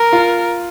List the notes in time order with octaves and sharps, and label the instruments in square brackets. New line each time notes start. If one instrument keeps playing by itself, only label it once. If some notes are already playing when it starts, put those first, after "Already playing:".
Already playing: [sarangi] A#4
[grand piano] F4